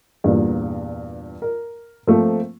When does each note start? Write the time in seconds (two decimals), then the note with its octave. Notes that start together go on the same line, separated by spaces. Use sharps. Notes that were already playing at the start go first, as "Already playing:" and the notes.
0.24 E2 G2 A#2 A#3
1.42 A#4
2.07 F3 A3 A#3 C4